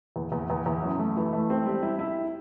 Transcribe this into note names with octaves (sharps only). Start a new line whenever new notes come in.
E2
E2
E2
E2
F#2
A3
E3
A3
C4
G3
E4
E4